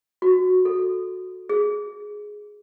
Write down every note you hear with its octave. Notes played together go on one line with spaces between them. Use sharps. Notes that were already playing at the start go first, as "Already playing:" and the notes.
F#4
A4
G#4